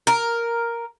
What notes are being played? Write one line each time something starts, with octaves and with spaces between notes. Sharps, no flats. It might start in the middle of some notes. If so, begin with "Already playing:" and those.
A#4